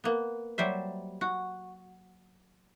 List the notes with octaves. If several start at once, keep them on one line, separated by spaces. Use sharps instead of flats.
A#3 B3
F#3 G3 C5 E5
F#4